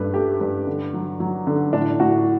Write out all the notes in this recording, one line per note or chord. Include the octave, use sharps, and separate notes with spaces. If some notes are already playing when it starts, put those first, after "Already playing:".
Already playing: G2 A3 B4
A3 G4
G2
D3
F#3
F#3
D3
A2 D4
A2 F#4